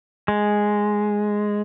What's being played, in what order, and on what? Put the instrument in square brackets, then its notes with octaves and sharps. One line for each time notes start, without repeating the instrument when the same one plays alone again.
[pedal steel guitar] G#3